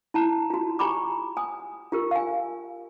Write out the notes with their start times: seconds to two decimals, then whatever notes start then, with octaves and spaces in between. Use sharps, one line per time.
0.14 E4 A5 A#5
0.50 F4 F#4
0.79 G4 G#5 A#5 B5 D6
1.37 G#5 D#6
1.92 F4 G4 A#4
2.11 F5 G#5